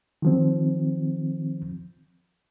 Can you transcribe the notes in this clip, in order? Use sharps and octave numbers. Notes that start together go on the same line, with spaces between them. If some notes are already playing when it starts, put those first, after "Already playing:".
D#3 F3 C4